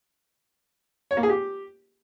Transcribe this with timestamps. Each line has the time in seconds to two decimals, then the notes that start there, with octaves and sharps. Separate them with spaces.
1.11 C#5
1.17 A#3
1.23 G#4
1.29 G4